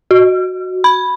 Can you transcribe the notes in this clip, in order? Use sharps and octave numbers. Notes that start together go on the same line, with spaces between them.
F#4
B5